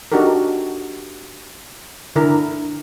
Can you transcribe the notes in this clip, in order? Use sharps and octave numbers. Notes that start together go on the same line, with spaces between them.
D4 D#4 F#4 G4 A4 A#4
D3 E4 A#4